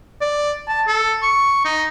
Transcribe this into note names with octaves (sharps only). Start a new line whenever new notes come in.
D5
A5
A4
C#6
D#4